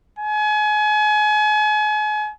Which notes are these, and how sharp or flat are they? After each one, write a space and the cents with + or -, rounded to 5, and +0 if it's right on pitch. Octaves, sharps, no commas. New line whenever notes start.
G#5 +35